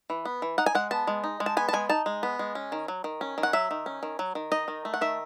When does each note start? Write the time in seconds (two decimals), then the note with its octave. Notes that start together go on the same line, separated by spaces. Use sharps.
0.10 E3
0.25 B3
0.42 E3
0.58 D#4 F#5
0.66 G#5
0.75 G#3 F#5
0.91 B3 A5
1.07 G#3
1.24 D#4
1.40 G#3
1.46 A5
1.57 B3 G#5
1.69 A5
1.73 G#3 G#5
1.89 D#4 A5
2.06 G#3
2.23 B3
2.39 G#3
2.55 C#4
2.72 D#3
2.88 F#3
3.04 D#3
3.21 C#4
3.38 D#3
3.43 F#5
3.53 F#3 E5
3.71 D#3
3.86 C#4
4.03 D#3
4.19 F#3
4.35 D#3
4.52 D#4 D#5
4.68 D#3
4.85 A3
4.94 F#5
5.01 D#3 E5